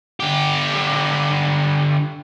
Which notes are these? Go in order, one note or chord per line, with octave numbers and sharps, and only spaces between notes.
D3 G4